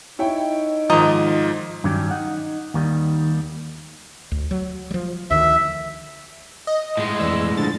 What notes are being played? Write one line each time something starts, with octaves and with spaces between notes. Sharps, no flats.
D#4 E4 C#5 G5
G#2 D#3 F3 D#5 A#5 C6
G2 D#3 F#3 C#4 D4 G4
D#4 F#5
D#2 D#3 G3
D2
F#3
F3 G3
D2 D#3 E5
D#5
A2 G#3
F2 E3 D5 E6
D3 F3 D4 A6